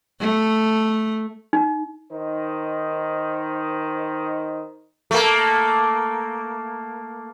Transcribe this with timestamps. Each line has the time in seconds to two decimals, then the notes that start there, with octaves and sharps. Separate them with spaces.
0.20 A3
1.53 D#4
2.11 D#3 D#4 C5
5.11 A3 A#3